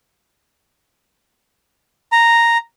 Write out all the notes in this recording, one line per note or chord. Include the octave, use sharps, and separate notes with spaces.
A#5